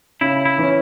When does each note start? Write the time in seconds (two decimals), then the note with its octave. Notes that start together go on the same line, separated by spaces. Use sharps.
0.21 C#3 E4
0.45 E4
0.58 E3 C#4